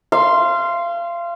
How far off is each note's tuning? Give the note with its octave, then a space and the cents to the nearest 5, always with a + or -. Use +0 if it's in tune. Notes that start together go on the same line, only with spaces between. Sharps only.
F5 -30 C6 +0